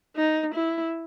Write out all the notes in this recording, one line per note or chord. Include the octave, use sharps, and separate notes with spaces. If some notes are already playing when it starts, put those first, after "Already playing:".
D#4
E4